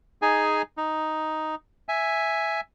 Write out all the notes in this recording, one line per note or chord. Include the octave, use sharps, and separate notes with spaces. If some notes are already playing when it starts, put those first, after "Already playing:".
D#4 G#4 G#5
D#4
E5 G#5